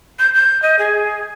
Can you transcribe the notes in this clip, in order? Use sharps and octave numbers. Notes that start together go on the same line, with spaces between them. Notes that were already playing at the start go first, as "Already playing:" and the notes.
G6
G6
D#5
G#4